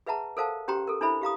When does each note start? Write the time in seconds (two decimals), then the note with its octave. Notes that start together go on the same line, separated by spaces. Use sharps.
0.06 G#4 B4 E5 F#5 A5 A#5
0.37 A4 A#4 C5 F5 F#5 A5
0.68 C#4 G4 C5 G5 A#5 C6
0.87 A4 A#4
1.01 D4 E4 A4 C5 E5 B5
1.22 G4 F5 A#5 D#6